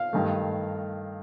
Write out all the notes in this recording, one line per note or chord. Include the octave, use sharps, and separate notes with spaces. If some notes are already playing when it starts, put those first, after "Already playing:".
Already playing: F5
G2 D#3 A3